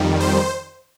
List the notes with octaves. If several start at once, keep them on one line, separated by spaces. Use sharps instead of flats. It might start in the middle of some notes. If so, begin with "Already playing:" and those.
Already playing: F2 D#3 G3
C5